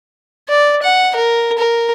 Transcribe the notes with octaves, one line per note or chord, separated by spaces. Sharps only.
D5
F#5
A#4
A#4